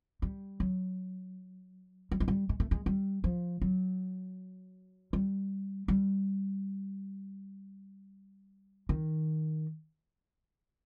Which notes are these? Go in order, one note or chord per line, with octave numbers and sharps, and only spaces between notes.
G3
F#3
G3
G#3
G3
G#3
A3
G#3
G3
F3
F#3
G3
G3
D#3